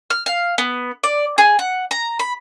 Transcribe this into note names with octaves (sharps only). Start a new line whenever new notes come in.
F6
F5
B3
D5
G#4
F#5
A#5
B5